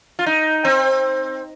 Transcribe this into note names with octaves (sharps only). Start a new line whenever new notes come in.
F4
D#4
C4